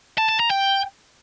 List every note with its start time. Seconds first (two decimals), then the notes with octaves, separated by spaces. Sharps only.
0.18 A5
0.29 A5
0.40 A#5
0.51 G5